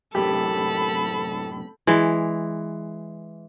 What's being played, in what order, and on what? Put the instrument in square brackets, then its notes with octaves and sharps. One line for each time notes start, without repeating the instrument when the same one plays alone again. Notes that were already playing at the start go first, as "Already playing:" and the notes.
[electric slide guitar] F#2 A2 C3 [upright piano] G4 [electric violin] A4 [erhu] B5
[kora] E3 G#3